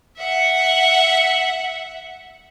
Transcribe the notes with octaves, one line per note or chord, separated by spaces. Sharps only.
E5 F#5